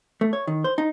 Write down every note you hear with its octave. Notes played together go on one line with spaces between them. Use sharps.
A3
C#5
D#3
C5
D#4